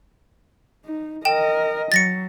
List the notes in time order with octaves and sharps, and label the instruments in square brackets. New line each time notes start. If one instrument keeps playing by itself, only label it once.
[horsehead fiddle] D#4
[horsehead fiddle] A#4 D#5 [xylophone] G5 E7
[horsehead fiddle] F#3 [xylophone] A6 A#6 C#7